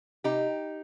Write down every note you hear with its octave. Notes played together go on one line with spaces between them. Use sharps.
C3 D#4 G4